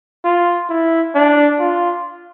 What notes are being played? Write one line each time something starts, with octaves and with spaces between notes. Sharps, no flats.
F4
E4
D4
F4